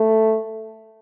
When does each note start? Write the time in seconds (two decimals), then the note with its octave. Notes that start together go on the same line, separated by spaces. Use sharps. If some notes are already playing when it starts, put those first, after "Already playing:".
Already playing: A3